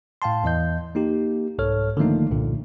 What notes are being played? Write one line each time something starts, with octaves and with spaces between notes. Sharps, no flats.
A2 F5 G5 A5 C6
E2 E3 D#5 G6
A#3 D#4 G4
C2 G#2 A4 C#5 F6
D3 D#3 F3 A3 A#3 D#4
C2 G2 A#2 D3